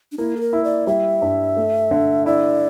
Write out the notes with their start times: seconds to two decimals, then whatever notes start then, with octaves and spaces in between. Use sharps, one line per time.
0.12 D4
0.18 A#3 E4
0.37 A4
0.41 A#4
0.53 E4
0.64 D5
0.87 G3 E5
1.22 G2
1.56 A3
1.91 D3
2.26 E4 D5